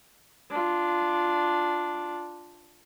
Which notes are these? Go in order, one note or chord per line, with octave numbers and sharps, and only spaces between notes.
D4 F4